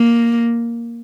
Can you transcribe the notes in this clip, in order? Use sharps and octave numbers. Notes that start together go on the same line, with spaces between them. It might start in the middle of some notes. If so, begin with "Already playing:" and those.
Already playing: A#3